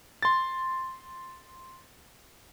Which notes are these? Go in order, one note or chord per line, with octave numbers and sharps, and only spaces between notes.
C6 A6